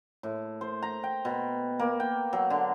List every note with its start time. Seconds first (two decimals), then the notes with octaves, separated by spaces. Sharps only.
0.23 A2
0.61 C5
0.82 A#5
1.04 G5
1.25 B2
1.79 A#3
2.00 G5
2.33 F#3
2.50 D3